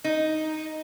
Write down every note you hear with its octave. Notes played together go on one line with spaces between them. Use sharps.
D#4